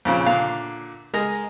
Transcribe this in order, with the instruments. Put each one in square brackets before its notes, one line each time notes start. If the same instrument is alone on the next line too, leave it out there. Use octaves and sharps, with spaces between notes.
[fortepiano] F2 A#2 C#3
[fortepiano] A#2 D3 [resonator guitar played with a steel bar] F5
[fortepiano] G#3 [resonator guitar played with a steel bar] A#4 D#5